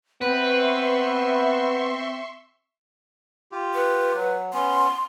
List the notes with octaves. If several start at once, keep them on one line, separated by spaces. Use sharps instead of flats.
B3 C4 B4 E5 C6 C#6
F4 G4
B4
F#3
B3 C#4 C6